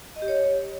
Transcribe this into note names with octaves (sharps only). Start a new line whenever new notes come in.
D#5
G4
C#5